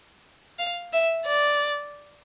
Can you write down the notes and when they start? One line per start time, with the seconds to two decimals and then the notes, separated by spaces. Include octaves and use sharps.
0.59 F5
0.93 E5
1.26 D5